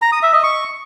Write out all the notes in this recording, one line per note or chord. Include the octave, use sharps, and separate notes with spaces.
A#5
D#6
E5
D#5
C#6